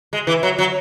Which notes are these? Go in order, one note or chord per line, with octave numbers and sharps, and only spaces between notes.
G#3
E3
F#3
F#3